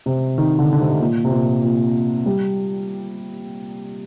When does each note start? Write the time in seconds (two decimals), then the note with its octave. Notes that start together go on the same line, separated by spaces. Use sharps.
0.06 C3
0.38 D#3
0.59 D3
0.73 D3
0.80 C3
0.90 C3
1.01 A#2
1.25 C3
1.32 A#2
1.64 A#2
2.26 G3